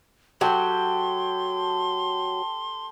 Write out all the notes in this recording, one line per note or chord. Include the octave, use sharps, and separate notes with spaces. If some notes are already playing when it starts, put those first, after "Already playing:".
F#3 G4 A4 G5 C6